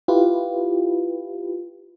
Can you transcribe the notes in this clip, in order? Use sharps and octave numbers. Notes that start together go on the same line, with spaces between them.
E4 F4 G4 B4